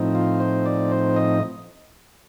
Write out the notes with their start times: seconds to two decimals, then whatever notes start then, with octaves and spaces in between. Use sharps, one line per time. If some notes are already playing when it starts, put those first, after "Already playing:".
Already playing: A2 F3 C4 D#4
0.15 F4
0.40 C5
0.66 D5
0.92 C5
1.16 D#5